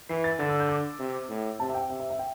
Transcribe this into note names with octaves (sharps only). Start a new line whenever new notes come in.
E3 C7
A6
D3 A6
E6
G6
D6
C3
A2
C3 A5
E5
G5
C3 E5
E5
E5
G5